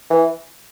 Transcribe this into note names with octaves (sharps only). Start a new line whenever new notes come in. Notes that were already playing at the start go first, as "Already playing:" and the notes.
E3